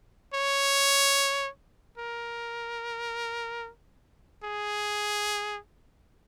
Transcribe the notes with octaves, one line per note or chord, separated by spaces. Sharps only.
C#5
A#4
G#4